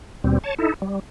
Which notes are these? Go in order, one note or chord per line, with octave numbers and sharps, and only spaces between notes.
D#2 B2 G3 C4
C#5 A5
D#4 E4 A4
G3